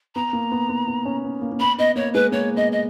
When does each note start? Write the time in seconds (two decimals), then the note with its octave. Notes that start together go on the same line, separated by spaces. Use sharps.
0.15 B3 A#5
0.33 A#3
0.52 B3
0.69 B3
0.88 B3
1.05 C#4
1.24 B3
1.42 A#3
1.52 A#3
1.60 B3 B5
1.78 B3 D#5
1.96 A#3 C#5
2.14 G#3 B4
2.32 A#3 C#5
2.57 B3 D#5
2.72 D#5